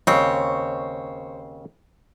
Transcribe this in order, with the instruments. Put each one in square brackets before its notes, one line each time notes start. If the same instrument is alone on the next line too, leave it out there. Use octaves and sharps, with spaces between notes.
[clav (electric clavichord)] D#2 C#3 C4 [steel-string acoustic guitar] C5 C#5